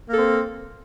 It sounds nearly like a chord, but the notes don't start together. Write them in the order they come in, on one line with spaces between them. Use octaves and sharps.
A#3 A4 C4